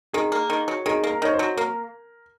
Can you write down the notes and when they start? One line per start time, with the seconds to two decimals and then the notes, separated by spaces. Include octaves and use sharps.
0.13 D#3 G#4
0.32 A#3
0.50 D#3
0.68 F#3
0.86 D#3 G#4
1.04 A#3
1.09 A#4
1.22 D#3 C#5
1.34 C5
1.39 F#3
1.57 A#3 A#4